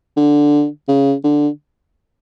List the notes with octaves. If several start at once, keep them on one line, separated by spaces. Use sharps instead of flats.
D3
C#3
D3